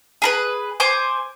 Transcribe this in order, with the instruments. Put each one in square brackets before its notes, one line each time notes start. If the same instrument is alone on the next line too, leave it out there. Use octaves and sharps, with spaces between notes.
[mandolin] G#4 A#4 B4
C5 G#5 D6